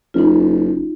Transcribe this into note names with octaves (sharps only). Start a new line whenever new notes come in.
F#1 D#4 F4